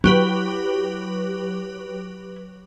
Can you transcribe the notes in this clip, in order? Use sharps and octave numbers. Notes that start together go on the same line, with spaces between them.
F#3 E4 G4 B4